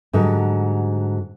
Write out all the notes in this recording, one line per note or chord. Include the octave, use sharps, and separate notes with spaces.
G#2 D3 F#3 G3